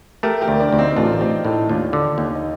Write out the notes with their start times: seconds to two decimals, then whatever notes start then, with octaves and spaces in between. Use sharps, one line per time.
0.23 A3 G4 A#4
0.41 G4 A#4
0.48 D2
0.60 D4
0.73 D2
0.78 C4 D#4
0.96 A1 D4 F4
1.20 C4 D#4 G4
1.44 A2 D#4 G4
1.69 D#2 D4 F4
1.93 D3
2.18 D#2
2.35 D#4